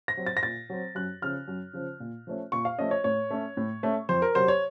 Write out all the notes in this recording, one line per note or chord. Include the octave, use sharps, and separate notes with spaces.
A#6
F#3 C4
A6
A#6
A#2 A6
F#3 C4
F#2 F#6
C#3 F3 F6
F#2
C#3 F3
A#2
F3 A3 C#4
A#2 C#6
F5
F3 A3 C#4 D#5
C#5
A2 C#5
A3 C#4
A2
A3 C#4
F2 C5
A#4
C3 F#3 C5
C#5